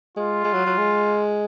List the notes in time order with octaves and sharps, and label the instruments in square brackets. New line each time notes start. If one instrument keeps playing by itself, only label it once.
[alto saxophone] G#3 [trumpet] F4
[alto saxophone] G#3
F#3
F#3
G#3